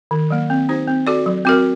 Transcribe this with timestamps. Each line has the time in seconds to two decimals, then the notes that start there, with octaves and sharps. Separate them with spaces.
0.11 D#3
0.30 F#3 A#3
0.50 C4
0.69 D#4 G4 C5
0.88 C4
1.07 F#4 A4 D5
1.26 F#3
1.45 C4 F#4 A#4